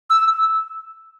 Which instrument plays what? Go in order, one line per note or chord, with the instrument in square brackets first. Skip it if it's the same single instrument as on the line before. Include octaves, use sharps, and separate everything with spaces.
[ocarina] E6